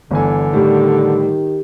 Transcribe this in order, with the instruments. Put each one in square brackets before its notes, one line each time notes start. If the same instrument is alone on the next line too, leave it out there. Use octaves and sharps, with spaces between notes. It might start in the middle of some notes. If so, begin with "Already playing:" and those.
[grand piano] G1 E3 G#5 [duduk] D3
[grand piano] A2 G3 [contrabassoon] D#3 [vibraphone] G4